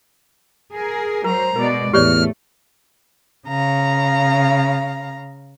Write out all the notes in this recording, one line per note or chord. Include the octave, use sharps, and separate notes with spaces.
G#4 A#4
F#3 A#4 C5 A#5
B2 G#3 A#4 D5
E2 A2 A3 G4 C#5 D5 F6
C#3 F5 A#5